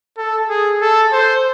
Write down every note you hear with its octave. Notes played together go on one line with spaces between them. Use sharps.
A4
G#4
A4
C5